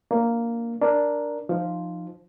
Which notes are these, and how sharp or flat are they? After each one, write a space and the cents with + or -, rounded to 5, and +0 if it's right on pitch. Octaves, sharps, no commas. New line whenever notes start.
F#3 +15 A#3 -5 D4 -10
D4 +0 A#4 +0
F3 +0 D#4 -20